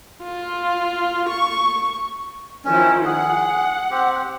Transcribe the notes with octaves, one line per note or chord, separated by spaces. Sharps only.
F4
C#6
D#3 F3 C#4 E4
G#4 F#5
C4 G4